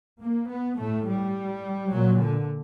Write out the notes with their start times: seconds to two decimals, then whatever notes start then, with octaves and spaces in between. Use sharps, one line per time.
0.21 A#3
0.50 B3
0.78 A2 A3
1.06 G3
1.92 A#2 F#3
2.20 D3